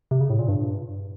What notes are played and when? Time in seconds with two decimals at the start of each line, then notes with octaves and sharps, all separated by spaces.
0.11 C3
0.20 C#3
0.30 A2
0.39 A#2
0.48 G2